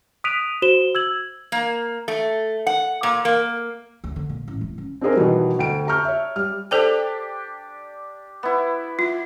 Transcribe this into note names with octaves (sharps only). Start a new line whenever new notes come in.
D#6 F#6 B6 D7 D#7 F7
F#4 C5 E7 G7
E6 G#6 F#7
A#3
A3
F#5
A#2
A#3
D2
D3
A#2
A1
D1
C#3
C4 D4 D#4 G#4 A#4 C5
B2 D#3 E3 F#3 G3
D2 G5 D7
A5 A#5 C#6 F6 G6
C#5 E5
G3 F6
D4 G4 A4 C5 G5
B3 E4
F4